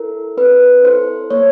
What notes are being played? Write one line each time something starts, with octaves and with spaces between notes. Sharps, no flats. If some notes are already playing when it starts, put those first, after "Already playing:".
Already playing: E4 A4 A#4
C4 B4
E4 A4 C5
A#3 C#5